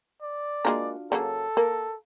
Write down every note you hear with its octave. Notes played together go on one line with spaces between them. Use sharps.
D5
G#3 A#3 D4 F4 F#4 A#4
C#3 F#3 A#3 A4
A#3 A#4